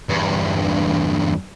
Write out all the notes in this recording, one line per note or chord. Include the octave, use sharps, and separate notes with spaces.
E2 G2